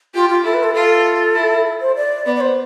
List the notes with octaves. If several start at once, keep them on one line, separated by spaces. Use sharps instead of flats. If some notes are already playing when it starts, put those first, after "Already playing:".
F4 G4
F4
E4 A4
B4
A4
F4 A4
E4
C5
D5
B3 D5
D5
C5